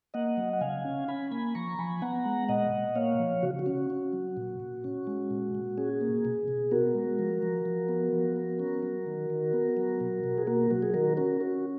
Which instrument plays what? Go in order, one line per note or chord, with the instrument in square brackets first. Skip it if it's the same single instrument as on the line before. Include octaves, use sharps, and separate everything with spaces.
[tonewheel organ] A#3 D#5 F#5
F#3
F#5
C#3 F5 G#5
C#4
C#4 G#5 B5
A#3 G#5 B5
F3 A#5 C#6
F3 G#5 B5
B3 F#5 A#5
G#3
A#2 D#5 F#5
A#2
A#3 C#5 F5
F3
C#3 F#4
F#4
C#4
C#4
F#3
A#2
A#2
C#4
G#3
A#2
A#2
C#4 G#4
A#3
B2
B2
B3 F#4 A#4
G#3
F3
F3
F3
B3
F3
B3
C#4
F#3
D#3
D#3
B3
F#3
B2
B2
G#4
A#3 F#4 A#4
F#3 F#4
G#4
D#3 F#4 A#4
C#4 F#4 A#4
C#4 F#4